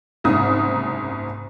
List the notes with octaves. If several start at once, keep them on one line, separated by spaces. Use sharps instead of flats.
F#1 C2 G#2 D#6